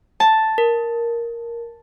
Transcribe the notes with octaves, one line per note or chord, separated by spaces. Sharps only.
A5
A#4